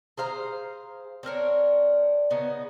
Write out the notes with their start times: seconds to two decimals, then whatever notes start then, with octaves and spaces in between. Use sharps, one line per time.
0.18 G#4 C5 F5 A#5
1.23 C4 D4 A#4 C#5
2.30 C#3 B3 D#4